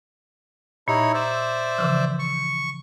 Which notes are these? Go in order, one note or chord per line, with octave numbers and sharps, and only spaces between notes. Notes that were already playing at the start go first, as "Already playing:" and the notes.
A#2 D#4 E4 C#5
C5 D5 E5
C#3 E3 F3
C#6